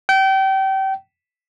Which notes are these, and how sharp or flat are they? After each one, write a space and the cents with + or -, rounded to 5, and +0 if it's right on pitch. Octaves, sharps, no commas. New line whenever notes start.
G5 -30